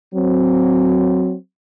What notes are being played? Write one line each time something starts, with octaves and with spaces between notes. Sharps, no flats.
F#3 C4